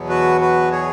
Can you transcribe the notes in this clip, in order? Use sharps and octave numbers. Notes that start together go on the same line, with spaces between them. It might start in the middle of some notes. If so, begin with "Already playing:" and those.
Already playing: E2 B2 F#3 B3
F#4 B4
F#4 B4
G#4 C#5